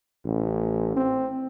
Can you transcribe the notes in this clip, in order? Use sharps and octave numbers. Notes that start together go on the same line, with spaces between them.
A1
C4